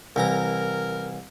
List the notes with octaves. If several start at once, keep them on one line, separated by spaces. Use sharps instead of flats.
C2 E3 A#4 A#5